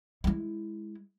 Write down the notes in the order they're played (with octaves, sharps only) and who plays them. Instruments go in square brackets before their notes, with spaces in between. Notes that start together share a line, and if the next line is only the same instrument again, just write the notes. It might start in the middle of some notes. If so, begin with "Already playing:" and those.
[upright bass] G#3 E4